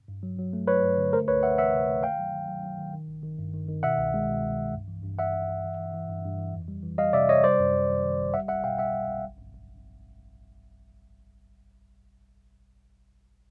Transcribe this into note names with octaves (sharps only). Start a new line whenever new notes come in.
G2
F#3
F#3
A3
F#3 B4 C#5
G2
D3
A3 A#4 C5
C#2 B4 C#5
A3 E5 F#5
E3 E5 F#5
C3
A3
D#3 F5 G5
F#3
D#3
F#3
F#3
D#3
D#3
G#1
D#3
G2
D#3
D#3
B2 E5 F#5
C2
G#3
B2
C2
C2
G2
E3
G2
E3 E5 F#5
E3
G2
E3
E3
E3
G2
G2
E3
F2
G3
E3
G3 D#5 F5
C3 D5 E5
C3 C#5 D#5
G3 C5 D5
F#2
F#2
D#3
D#3
G1
G3 E5 F#5
B1 E5 F#5
B2 F5 G5
G3 E5 F#5
G3
B1
G1
G1
G1